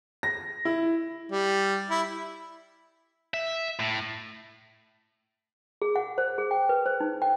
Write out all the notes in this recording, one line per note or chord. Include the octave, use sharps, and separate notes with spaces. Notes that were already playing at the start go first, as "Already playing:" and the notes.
A#6
E4
G3
E4
E5
A2
G#4
F#5
C5
G#4
G5
B4
C5
D#4
G5